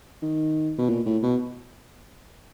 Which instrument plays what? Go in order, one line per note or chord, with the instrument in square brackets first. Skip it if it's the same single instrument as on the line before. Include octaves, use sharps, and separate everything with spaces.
[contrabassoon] D#3
B2
A#2
A2
B2